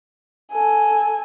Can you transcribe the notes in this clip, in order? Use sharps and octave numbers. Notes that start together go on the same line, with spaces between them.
A4 G#5